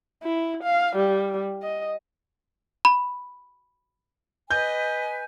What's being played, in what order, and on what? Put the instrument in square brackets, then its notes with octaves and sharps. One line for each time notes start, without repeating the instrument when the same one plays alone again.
[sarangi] E4
F5
G3
D#5
[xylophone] B5
[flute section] B4 G#5 [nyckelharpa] D#5 [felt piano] G6